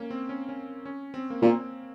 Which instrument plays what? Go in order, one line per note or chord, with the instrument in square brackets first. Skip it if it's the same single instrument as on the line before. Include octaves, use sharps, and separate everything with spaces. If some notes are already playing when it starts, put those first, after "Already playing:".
Already playing: [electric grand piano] A#3 C#4
C4
C#4
C#4
C#4
C4
A#3
[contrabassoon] A#2 [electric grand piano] C4